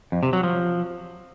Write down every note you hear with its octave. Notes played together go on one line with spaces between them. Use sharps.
F2
C3
F#3
F3